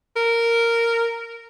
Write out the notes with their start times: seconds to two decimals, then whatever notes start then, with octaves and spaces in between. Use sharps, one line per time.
0.16 A#4